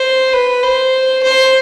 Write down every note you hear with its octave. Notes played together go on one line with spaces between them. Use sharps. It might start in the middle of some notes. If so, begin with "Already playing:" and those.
Already playing: C5
B4
C5
C5